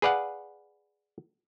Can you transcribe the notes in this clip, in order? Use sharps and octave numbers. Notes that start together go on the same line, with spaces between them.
G#4 B4 D5 F5 F#5